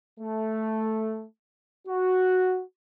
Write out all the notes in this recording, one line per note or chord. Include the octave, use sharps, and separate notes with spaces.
A3
F#4